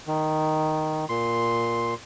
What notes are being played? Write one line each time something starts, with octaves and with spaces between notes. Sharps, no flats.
D#3
A#2 C6